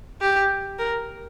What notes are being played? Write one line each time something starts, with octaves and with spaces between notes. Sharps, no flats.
G4
A#4